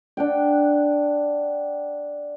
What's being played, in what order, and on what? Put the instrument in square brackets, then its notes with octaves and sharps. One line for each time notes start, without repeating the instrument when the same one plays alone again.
[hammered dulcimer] D4 F#5 G5